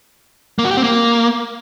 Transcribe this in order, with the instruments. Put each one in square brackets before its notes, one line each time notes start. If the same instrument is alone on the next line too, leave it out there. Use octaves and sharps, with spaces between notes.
[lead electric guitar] A#3
F#4
G4
C4
A#3